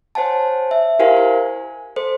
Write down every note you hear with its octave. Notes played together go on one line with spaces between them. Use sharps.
C5 C#5 F#5 G#5 A5
E5
E4 G4 A#4 C5 F5 G#5
G#5
A4 C5